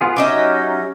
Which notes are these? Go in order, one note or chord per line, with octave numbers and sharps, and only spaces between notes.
B3 F4 G#4
F#3 C#4 D#4 G4 D#5 E5